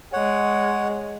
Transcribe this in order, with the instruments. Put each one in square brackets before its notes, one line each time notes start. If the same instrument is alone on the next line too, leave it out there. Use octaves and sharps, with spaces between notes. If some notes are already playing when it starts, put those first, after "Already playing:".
[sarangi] G#3 [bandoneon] C#5 F#5